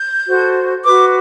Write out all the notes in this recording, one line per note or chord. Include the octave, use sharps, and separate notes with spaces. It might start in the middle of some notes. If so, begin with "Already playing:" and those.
Already playing: G6
F#4 A4 C5
F#4 B4 D6